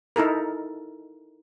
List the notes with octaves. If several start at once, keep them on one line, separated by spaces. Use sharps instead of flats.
D#4 E4 A4 A#4